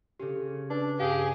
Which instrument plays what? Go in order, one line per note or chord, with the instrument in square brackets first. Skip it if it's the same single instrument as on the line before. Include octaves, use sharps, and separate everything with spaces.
[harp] C#3 C#4 [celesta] G4 A4
[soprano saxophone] D4 [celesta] B4
[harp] G2 [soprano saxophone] G4 [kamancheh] G#4 [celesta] F5